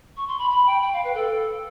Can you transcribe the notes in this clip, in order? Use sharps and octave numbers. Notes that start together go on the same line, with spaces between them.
C#6
C6
B5
B5
G5
G5
F5
B4
A4